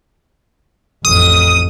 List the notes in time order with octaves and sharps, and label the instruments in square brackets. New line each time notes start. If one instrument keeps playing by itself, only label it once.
[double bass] A1 F2 [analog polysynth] D#6